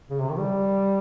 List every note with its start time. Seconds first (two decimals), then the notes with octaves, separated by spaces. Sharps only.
0.10 C#3
0.20 C3
0.29 D#3
0.38 G3